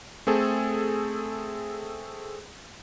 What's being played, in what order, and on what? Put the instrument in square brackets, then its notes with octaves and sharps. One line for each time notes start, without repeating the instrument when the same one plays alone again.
[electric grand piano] A3 C4 G#4 A4